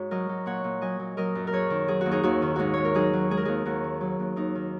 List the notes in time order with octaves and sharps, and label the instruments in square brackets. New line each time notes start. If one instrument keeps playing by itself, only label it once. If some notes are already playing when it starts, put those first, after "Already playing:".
Already playing: [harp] G#2 F#4 C#5
F#3 A#4 D#5
F#3
A#2 C#5 F#5
A#2
F#3 D#5 G#5
F#3
F#3 A#4 D#5
F#2
A#4
F#2 G#4 C#5
D#3
F#3 G#4
D#2 F#4
D#4 G#4
D#2 F#4
D#3
G#2 D#4 F#4
G#2 C#5
A#4
F#3 D#4 G#4
F#3
G#3 G#4
A#4
D#2 D#4 G#4
D#2 F#4
D#3
F#3
D#2
D#2 D#4
D#3